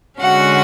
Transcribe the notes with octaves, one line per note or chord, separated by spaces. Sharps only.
D3 G#3 C#4 F#4 F#5